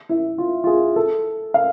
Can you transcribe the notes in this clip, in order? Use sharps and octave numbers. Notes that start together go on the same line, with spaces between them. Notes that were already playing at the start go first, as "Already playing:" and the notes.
E4
F4
F4
G#4
A4
F5